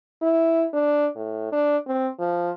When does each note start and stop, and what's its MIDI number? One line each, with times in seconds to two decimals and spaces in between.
0.22 0.66 64
0.74 1.08 62
1.16 1.48 45
1.52 1.77 62
1.87 2.09 60
2.19 2.51 53